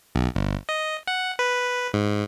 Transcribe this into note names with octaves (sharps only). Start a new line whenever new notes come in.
B1
G1
D#5
F#5
B4
G#2